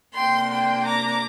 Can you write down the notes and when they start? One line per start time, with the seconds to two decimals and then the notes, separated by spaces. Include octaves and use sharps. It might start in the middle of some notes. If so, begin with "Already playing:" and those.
0.14 C3 A#3 D4 G5 C6
0.50 G5 C6
0.85 A#5 D6